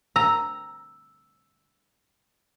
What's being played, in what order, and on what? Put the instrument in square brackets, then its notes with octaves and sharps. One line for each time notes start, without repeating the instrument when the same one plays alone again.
[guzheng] A#5 [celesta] E6